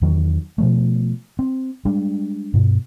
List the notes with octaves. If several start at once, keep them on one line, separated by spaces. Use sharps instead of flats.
E2 D#3 F#3
B2 F3 A3
C4
G3 G#3 D4
G2 B2